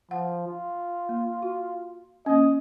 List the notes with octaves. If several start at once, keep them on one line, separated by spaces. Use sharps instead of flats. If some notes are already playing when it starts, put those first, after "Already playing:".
F3 F#5
F4
A#3
F#4
A#3 C#4 D#5